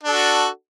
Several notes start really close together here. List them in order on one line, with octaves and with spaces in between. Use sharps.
D4 A4 F#4